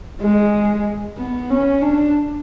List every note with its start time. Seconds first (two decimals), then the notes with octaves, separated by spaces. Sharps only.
0.21 G#3
1.18 B3
1.50 C#4
1.81 D4